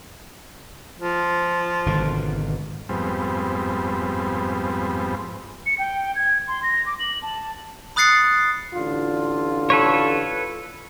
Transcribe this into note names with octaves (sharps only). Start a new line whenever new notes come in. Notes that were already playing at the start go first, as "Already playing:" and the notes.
F3
G#1 B2 D3
F2 G#2 G3 B3 C4
C#7
G5
G#6
C6
A#6
D6
F#7
A5
B5 D#6 F#6 A6 C7 C#7
A1 D3 F4
A4 B4 C#5